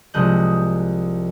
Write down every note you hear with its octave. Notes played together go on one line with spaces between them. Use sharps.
C2 F3 G#3 D#5 F#6 G6